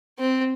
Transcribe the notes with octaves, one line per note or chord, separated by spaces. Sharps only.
C4